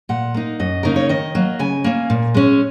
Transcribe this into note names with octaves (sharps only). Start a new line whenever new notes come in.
A#2 F#5
A#3 D#4
F#2 D#5
C#3 A#3 D#4 A#4
C#5
D#3 D#5
F#3 A#3
C#3 G#5
A#3 C#4
A#2
G#3 C#4